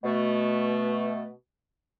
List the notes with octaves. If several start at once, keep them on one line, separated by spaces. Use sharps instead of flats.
B2 A3